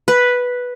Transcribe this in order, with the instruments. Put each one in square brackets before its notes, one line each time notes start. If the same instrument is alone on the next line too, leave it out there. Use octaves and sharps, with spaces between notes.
[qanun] B4